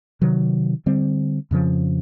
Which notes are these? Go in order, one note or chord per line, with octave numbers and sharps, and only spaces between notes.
C3 D#3 F#3
D3 G3 C4
F2 C#3 F3